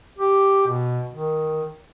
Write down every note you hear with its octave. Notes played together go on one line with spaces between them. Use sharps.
G4
B2
D#3